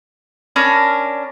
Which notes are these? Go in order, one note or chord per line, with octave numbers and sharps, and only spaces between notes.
C#4 D4 A#4 B5